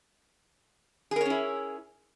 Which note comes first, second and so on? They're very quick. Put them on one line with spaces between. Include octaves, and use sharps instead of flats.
G#4 A#4 C#5 C#4 E4